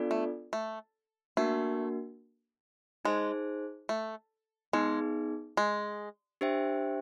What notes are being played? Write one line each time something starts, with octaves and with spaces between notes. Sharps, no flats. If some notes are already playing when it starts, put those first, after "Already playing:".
Already playing: B3 D4 F4 A4 D5
A3
A3
A3 A#3 D4 F#4 A#4
G#3 D#4 G#4 C5
A3
G#3 B3 D#4 G#4
G#3
D4 G4 C5 E5 G5